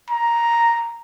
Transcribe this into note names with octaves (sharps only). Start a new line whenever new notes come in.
A#5